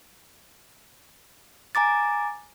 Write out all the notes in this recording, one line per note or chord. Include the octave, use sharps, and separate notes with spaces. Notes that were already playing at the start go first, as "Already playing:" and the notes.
G#5 A#5 D6 A6